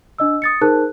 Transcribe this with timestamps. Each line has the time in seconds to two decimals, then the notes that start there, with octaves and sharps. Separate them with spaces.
0.18 D4 D#5 E6
0.42 D#6 A6 C#7
0.61 D#4 G#4 A#4 C5 A5 F#6